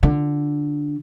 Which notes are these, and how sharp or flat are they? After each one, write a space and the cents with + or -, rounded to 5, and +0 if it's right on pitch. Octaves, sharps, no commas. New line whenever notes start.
D3 +0 F4 +0